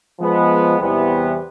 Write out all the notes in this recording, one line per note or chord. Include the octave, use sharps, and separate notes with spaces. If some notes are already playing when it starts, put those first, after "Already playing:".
F3 G#3 B3
E2 C3 E3 G3 B3